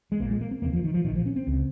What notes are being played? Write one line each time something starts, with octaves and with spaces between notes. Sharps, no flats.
G#3
A#1 A#2 A#3
G#3
A#3
C4
F1 D#2 C#3 A#3
F3
D#3
F3
A#1 A#2 D#3
F3
C#4
C4
C#2 C#3